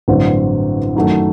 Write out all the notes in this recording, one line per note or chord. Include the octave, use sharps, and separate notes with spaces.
A1 G2 D3 F#3 C4
F#2 D#3 F#3 A3